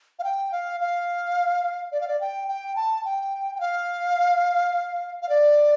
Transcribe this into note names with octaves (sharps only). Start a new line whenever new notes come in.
F5
G5
F5
F5
D5
F5
D5
G5
G5
A5
G5
G5
F5
F5
D5